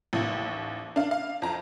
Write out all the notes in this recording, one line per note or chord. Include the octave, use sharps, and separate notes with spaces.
A1 D#2
D4 F5
F5
F2 A#5